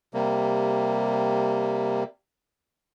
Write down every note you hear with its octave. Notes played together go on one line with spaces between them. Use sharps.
C3 G3 A#3